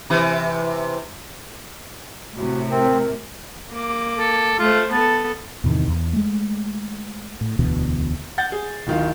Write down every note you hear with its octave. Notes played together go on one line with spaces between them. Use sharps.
C3 E3
A2 C3 F#4
C4 A#4
A#3 D6
A4
A3 F4 C5
B3 A4 A5
E2 A2 C3 D#3
E2
G#3 A3
A2
E1 D2 B2 E3
F#5 G6 A6
G#4
D1 D#3 F4